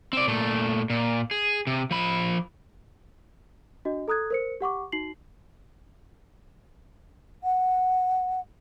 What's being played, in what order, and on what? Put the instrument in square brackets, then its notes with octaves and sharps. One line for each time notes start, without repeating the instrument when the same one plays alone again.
[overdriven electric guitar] C4 D5
A#2 A3
A#2
G#4
C3
F3 B5
[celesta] D4 F#4 D#5
A4 A#5 D#6 F#6 G#6
A#4 C5 C#7
G4 F#5 C#6 D6
D#4 F#4 C7 F#7
[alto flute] F#5